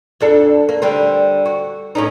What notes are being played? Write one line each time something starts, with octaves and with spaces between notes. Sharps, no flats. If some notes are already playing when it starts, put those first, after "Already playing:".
F2 D4 A4
A#3
D3 G3 C4
F#4
A2 C#4 D#4